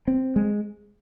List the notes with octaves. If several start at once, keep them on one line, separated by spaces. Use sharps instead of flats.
C4
G#3